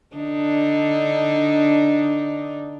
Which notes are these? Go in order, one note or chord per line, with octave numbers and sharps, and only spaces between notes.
D3 D4 D#4